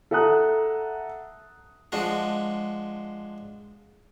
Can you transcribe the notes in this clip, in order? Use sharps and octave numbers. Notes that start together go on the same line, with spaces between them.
A4 E5 F#5 A#5 D#6 F#6
F3 G#3 D4 F4 F#4